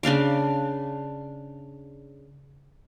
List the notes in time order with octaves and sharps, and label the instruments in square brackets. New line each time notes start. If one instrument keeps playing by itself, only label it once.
[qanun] C#3 D4 F5 D6